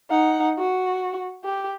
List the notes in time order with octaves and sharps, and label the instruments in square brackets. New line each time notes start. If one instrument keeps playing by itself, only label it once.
[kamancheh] D#4 F#5
F#4
G4